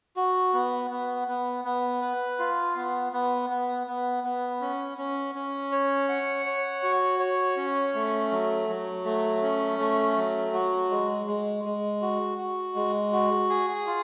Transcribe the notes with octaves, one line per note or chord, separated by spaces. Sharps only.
F#4
B3
B3
B3
B3
B4
F4
B3
B3
B3
B3
B3
C#4
C#4
C#4
C#5
F#5
C#5
F#4
C#5
C#4
A3
F#3
F#3
A3
C#4
A3
F#3
F#4
G#3
G#3
G#3
F#4
F#4
G#3
F#4
G#4
F4